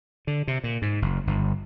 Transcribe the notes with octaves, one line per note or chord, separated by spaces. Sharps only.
D3
C3
A#2
G#2
F#1
G1